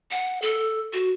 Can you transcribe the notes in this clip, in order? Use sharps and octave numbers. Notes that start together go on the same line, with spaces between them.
F#5
A4
F#4